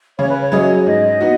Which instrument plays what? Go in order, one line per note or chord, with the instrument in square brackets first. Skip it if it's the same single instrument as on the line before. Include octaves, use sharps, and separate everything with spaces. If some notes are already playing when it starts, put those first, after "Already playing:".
[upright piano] C#3 [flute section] C#5
[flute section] B4
C#5
[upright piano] F#3 C#4 G#4 D#5
[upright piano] G#2 [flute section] D#5
[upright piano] B3 D#4 F#4